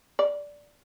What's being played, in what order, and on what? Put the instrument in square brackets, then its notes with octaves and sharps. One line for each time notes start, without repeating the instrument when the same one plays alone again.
[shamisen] D5